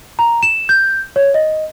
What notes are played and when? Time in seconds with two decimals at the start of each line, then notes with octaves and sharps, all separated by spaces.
0.19 A#5
0.43 E7
0.69 G6
1.16 C#5
1.34 D#5